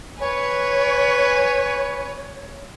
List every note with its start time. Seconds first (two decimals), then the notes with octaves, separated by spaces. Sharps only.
0.20 B4 C#5 G#5